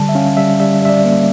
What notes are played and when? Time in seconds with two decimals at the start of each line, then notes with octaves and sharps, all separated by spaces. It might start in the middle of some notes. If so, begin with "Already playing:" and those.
Already playing: D3 G3 A5
0.09 E5
0.15 C#4 F5
0.37 G3 E5
0.60 G3 E5
0.82 G3 E5
0.89 D5
1.05 A#3